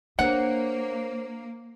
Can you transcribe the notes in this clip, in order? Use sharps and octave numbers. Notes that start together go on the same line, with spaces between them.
A#3 D4 A#4 C5 C#5 F#5